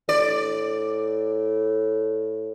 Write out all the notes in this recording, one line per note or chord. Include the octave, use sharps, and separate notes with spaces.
A2 D5